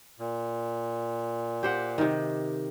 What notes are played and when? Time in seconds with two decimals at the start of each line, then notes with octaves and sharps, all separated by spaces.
0.19 A#2
1.63 G4 C5 F#5
1.98 C3 D#3